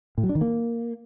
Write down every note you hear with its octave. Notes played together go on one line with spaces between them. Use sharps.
A2
F#3
D4
D#3
A#3